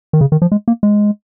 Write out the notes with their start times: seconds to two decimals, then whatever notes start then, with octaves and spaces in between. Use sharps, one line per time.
0.13 D#3
0.21 C#3
0.32 D#3
0.42 F3
0.52 G#3
0.68 A#3
0.83 G#3